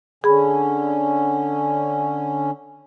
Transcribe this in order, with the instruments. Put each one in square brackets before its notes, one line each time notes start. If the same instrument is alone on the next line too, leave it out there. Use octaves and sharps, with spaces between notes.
[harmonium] D3 C#4 [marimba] G#4 B5